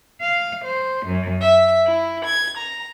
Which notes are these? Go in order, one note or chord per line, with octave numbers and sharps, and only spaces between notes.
F5
C5
F#2
E5
E4
G#6
A#5